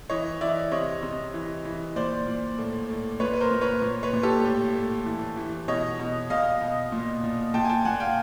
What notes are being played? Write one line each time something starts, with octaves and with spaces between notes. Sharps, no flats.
E3 C#5 D#5
E3 D5 E5
C3 C#5 D#5
C3
E3
E3
A#2 C5 D5
A#2
A2
A2
A#2 B4 C#5
B4
A#4 C5
A#2
B4 C#5
A#2
B4 C#5
A#2
G4 A4
A2
A2
E3
E3
B2 C#5 D#5
B2
B2 D#5 F5
B2
A#2
A#2
A#2 G5 A5
G#5
G5 A5
A#2 F#5 G#5
F5 G5